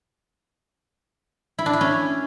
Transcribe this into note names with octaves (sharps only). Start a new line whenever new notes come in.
E4
D4
E4
C#4